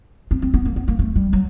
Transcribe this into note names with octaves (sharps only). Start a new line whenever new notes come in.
C4
C4
B3
A#3
B3
A#3
A3
G3
F#3